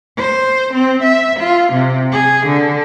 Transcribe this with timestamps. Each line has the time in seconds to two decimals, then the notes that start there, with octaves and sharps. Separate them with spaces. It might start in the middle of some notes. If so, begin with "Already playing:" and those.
0.17 C5
0.74 C4
1.03 E5
1.40 F4
1.73 C3
2.12 G#4
2.47 D3